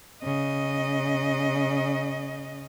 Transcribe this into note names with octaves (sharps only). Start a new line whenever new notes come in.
C#3 D#5